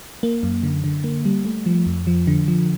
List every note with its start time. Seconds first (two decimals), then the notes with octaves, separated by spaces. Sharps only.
0.23 A#3
0.43 F#2
0.63 D3
0.84 D3
1.04 A#3
1.25 G3
1.45 A3
1.66 F3
1.86 F2
2.07 F3
2.27 D3
2.48 F3